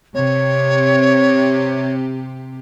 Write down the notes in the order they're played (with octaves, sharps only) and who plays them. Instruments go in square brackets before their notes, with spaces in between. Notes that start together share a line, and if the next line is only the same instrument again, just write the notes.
[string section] C3 G4 [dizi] C#5